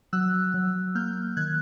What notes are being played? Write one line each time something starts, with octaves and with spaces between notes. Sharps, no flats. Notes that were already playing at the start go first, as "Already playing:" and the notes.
F#3 E6 F#6
F#3
A#3 F6 G6
D#3 F#6 G#6